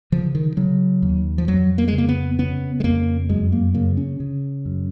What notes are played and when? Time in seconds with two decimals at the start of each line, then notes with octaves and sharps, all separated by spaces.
0.12 C#3 F3
0.35 D#3
0.57 C#3 F#3
1.02 D#2
1.38 F3
1.48 F2 F#3
1.78 A#3
1.88 G#3
1.93 C#3
1.98 A#3
2.08 B3
2.39 C#3 B3
2.80 G#3
2.84 F2 A#3
3.29 F#2 G#3
3.52 A#3
3.74 C#3 A#3
3.97 C#4
4.20 C#3
4.66 F#2